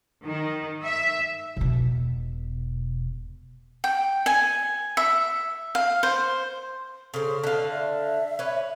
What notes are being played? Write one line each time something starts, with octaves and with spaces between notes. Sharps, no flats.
D#3
E5
E1 B2
G5
G#5
E5
F5
C5
C#3 A4 C5
D3 F5
E5
C#4 B4